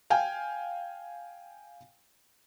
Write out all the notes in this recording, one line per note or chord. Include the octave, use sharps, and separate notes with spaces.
F5 G5 G#5